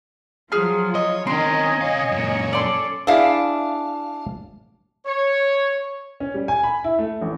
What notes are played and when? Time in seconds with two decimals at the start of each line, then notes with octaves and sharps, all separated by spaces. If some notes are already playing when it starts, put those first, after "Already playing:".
0.52 F3 F#3 F4 G#4 F6
0.95 C#5 D#5
1.27 D#3 C4 C#4 D#5 G#5 C6
1.81 C3 C#4 C#5 F5
2.12 F#2 A#2
2.53 A4 D5 C6
3.07 D4 E4 G#4 E5 F5
5.06 C#5
6.20 C#4
6.34 G3
6.48 G#5
6.63 B5
6.84 E4
6.99 A3
7.22 A1